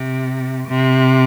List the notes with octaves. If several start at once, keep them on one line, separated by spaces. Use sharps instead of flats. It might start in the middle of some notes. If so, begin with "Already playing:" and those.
Already playing: C3
C3